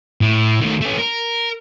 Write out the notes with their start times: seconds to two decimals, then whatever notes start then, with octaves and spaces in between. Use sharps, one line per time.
0.21 A2
0.61 D#3 A3
0.81 A3 C#4
0.98 A#4